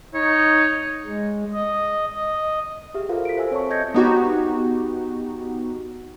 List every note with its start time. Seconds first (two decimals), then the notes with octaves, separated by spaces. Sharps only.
0.14 D#4 C#5
1.05 G#3
1.54 D#5
2.16 D#5
2.94 G4 G#4 E5 F6
3.09 F4 F#4 A4 A#4 C5 F5
3.25 B6 D7
3.37 A4 C5 E5 G#5 E6
3.51 C4 C#5 A5 C#6
3.70 D#5 G6 G#6 A#6 C#7
3.94 B3 D#4 F#4 G4